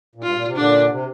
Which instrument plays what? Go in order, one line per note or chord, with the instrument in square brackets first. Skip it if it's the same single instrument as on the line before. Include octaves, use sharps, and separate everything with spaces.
[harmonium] A#2
[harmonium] G2 [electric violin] F4
[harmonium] A#2
C3
[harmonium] A#2 D3 [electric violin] D4
[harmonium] C3